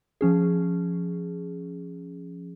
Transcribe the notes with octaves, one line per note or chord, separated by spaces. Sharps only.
F3 C#4 G#4